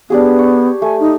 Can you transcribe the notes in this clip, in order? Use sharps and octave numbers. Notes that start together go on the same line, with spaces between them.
B3 D4 G4 G#4
C#6
A3 G#5
D#4